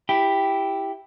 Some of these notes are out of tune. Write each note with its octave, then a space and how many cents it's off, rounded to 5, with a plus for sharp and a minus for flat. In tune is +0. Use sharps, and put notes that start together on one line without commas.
E4 +0 G4 +0